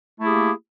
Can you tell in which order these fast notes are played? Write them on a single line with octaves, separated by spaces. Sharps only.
A3 E4 G#4 A#3 G4